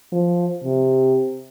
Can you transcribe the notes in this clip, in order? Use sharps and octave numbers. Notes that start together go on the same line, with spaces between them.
F3
C3